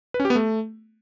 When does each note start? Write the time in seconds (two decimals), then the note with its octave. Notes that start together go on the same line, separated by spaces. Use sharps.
0.14 B4
0.20 C#4
0.25 G4
0.30 B3
0.35 A3